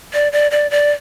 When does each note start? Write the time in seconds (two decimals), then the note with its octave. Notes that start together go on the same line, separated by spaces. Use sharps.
0.14 D5
0.32 D5
0.51 D5
0.71 D5